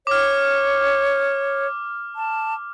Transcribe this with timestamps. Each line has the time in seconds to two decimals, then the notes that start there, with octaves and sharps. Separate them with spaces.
0.07 C#5 D6 F6
2.16 A5